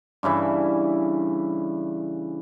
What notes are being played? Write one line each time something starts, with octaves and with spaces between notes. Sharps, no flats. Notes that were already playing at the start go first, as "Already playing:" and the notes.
G2 C#3 E3 E4